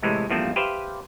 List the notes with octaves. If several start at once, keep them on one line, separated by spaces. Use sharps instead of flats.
A2 C3 E3 G#3
E2 G2 F3 A3 A#3 C4
G4 B4 C5 E5 F5